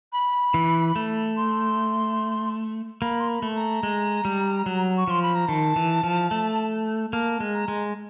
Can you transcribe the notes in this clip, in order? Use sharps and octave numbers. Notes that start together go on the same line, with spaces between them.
B5
E3
A3
C6
A#3 B5
C6
B5
A3
A#5
G#3
G3
F#3
C#6
F3 C6
B5
A#5
D#3 A5
E3
F3
A3
A#3 A5
G#3
A#5
G#3